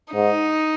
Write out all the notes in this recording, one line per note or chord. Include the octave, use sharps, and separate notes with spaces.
G#2 D#4